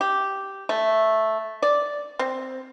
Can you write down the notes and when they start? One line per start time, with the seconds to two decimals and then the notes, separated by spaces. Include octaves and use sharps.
0.01 G4
0.69 A3
1.62 D5
2.19 C4